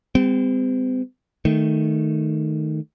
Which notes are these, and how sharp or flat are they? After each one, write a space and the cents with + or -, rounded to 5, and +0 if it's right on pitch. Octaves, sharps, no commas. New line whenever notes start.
G3 +35 C4 -40
D#3 +0 A3 +0